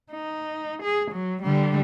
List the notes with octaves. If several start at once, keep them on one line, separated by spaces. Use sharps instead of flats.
D#4
G#4
F#3
D3 G3